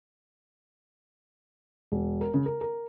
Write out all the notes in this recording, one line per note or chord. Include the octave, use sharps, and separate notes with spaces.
E1
A#4
C#3
A#4
A#4